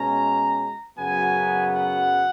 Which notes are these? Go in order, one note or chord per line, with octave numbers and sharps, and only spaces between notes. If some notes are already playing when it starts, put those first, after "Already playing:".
Already playing: B2 G#3 C#4 A#5
F#2 C#3 F#3 B3 G#5
F#5